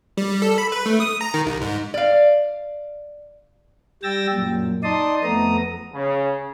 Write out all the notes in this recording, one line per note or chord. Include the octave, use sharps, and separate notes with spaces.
G3
G3
A4
B5
B4
A3
D#6
A#5
D#3
C2
G#2
D5 F5
G3 G5 E6 A6 A#6
F#2 A#2
D#4 D5 A5 C6 D#6
F2 A3 B3 A#5 D#6
C#3